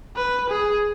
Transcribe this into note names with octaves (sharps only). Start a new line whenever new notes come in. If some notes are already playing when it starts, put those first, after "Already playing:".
B4
G#4